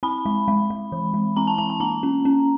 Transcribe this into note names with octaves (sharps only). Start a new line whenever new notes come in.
C4 B5
G#3
G#3
G#3
E3
G#3
C4 A#5
A5
G#3 A5
A5
A#3 A#5
C#4
C#4